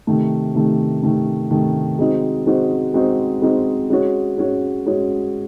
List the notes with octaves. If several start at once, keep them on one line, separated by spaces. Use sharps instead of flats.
C3 D#3 A3
C3 D#3 A3
C3 D#3 A3
C3 D#3 A3
G#3 C4 D#4 F#4 C5
G#3 C4 D#4 F#4 C5
G#3 C4 D#4 F#4 C5
G#3 C4 D#4 F#4 C5
G#3 C#4 F#4 C#5
G#3 C#4 F#4 C#5
G#3 C#4 F#4 C#5